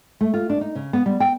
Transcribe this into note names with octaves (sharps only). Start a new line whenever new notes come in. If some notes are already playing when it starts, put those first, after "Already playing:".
A3
F4
D4
D#4
C#3
B3
G3
G5